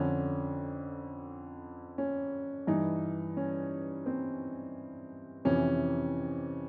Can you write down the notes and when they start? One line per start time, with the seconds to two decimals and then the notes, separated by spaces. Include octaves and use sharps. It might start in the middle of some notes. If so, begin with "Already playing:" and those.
Already playing: F2 D3 C#4
1.98 C#4
2.67 G2 E3 D#4
3.37 C#4
4.06 C4
5.45 F2 C3 E3 C#4